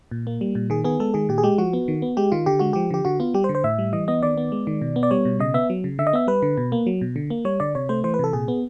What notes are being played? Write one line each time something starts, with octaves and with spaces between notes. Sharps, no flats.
A#2
A#3
G3
A#2
D#3 G#4
B3 G#4
G#3 A4
D#3 G#4
A#2 G4
G#4
G#3 G4
F3 F#4
B3
D#3
B3
G#3 G4
D#3 F4
D3 G4
G#3 F#4
F3 G4
D3 G4
D3 F#4
B3 F4
G3 G4
C5
D3
C5
A2 E5
G3
E3 D#5
B3 D#5
D#3 D5
B3
G#3
D#3
B2
B3
D5
G3 C#5
B2
C#3 D#5
B3 E5
F#3
C#3
D3 E5
D#5
B3 E5
G3 B4
D3
B2
A#3
F#3
B2
D3
A#3
G3 C#5
D3 D5
C3 C#5
A3 C5
E3 C5
B4
C3 A4
A#2 G#4
B3